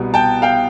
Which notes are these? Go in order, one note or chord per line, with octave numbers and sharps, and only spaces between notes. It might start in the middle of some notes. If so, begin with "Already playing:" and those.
Already playing: C2 B2 G3 B3
G5 A5
F5 G5